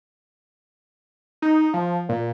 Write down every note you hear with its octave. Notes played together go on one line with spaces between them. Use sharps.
D#4
F3
A#2